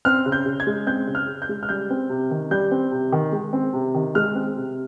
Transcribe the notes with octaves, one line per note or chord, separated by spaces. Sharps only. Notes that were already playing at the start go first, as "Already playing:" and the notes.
C4 F6
C#3
G6
C#3
G#6
G#3
C4 G6
C#3
F6
C#3
G6
G#3
F6
G3 G6
C4
C3
D#3
G3 G6
C4
C3
D#3
G#3
C4
C3
D#3
G#3 F6
C4
C3